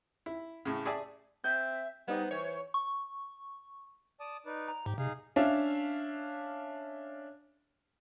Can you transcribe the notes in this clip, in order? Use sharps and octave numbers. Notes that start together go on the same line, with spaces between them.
E4
A2 C#3
G#4 D5 E5 G#5 A5
C4 E5 G6
G3 B3 D#4 C5
E3 C#5
C#6
D5 A5 D#6
D#4 B4 D5
A#5
G#2 G4
C3 D#4 G#4 F5
C#4 D4 E5 F5